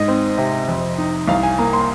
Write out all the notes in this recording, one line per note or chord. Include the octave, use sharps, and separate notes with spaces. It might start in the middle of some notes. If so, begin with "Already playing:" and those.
Already playing: G#2 D#5
C4
C3
F2
D#4
C2 F5
G#5
A#3 A#5
C6